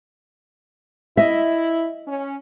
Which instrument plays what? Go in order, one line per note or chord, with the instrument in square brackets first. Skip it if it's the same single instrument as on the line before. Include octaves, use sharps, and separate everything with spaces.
[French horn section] E4 [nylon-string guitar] D#5 E5
[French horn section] C#4